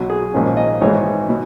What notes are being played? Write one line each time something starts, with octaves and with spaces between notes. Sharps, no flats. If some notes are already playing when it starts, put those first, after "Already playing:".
Already playing: B1 B2 F#3
G#4
A#1 G#2 D#3 A#3 C#4
D#5
G#1 G#2 E3 G#3 B3 C#5
B2 F#3